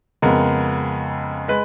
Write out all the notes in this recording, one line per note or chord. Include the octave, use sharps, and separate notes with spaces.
F2 C#3 G#3 B3 A#4
G#3 B4